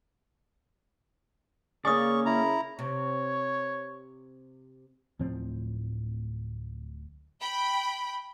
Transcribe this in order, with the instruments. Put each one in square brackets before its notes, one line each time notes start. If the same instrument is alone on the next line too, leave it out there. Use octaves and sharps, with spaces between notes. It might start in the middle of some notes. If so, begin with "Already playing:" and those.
[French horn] C#3 [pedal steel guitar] A#3 C#4 D5 [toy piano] G#5 D#6 [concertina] C#6
[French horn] C#3 [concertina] E4 A#5
[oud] C3 [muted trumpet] C#5
[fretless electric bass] D1 A2 F3 C4
[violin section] G5 B5